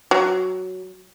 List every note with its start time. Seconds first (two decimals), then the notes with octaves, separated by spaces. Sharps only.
0.11 F#3